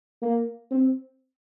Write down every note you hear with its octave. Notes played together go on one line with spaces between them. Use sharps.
A#3
C4